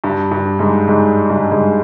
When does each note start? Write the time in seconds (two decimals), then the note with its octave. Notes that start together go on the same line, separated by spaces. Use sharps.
0.04 G2
0.31 G2
0.59 G#2
0.88 G#2
1.30 G2
1.51 G#2